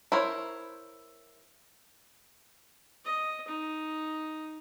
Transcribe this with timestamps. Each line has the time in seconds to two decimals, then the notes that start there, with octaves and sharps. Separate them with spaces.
0.12 E4 A#4 C5 C#5
3.05 D#5
3.48 D#4